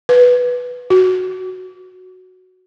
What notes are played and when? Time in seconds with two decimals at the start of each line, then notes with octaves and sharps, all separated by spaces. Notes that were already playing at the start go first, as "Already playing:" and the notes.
0.09 B4
0.90 F#4